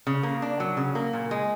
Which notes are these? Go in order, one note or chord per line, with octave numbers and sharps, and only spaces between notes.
C#3
A#3
D4
F#3
C#3
A#3
A#2
G#3